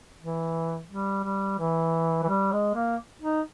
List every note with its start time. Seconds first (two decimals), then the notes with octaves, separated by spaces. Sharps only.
0.19 E3
0.89 G3
1.24 G3
1.59 E3
2.23 E3
2.29 G3
2.52 G#3
2.75 A#3
3.22 D#4